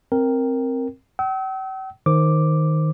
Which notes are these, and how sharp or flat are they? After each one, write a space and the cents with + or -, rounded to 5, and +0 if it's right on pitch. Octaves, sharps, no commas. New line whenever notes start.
C4 +10 A#4 +0 G5 +0
G5 -45 E6 -40
D#3 +0 C5 +5 D6 +0